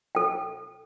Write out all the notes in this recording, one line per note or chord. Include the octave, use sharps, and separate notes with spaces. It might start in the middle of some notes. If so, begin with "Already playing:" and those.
A4 G5